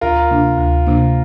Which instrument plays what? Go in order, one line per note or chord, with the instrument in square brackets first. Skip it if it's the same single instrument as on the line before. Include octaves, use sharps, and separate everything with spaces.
[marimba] D2 [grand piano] F4 A#4
[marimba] C3 A#3 D4
D2
C3 A#3 D4